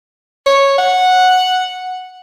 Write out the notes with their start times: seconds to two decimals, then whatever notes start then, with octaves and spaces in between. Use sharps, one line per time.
0.46 C#5
0.78 F#5